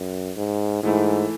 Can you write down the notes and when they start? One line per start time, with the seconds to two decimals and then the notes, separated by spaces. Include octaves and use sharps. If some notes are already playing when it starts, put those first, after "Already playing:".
Already playing: F#2
0.37 G#2
0.83 G#2 E3 A3 E4